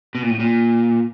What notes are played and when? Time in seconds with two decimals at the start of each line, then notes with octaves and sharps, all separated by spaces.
0.15 B2
0.23 A#2
0.31 A2
0.40 A#2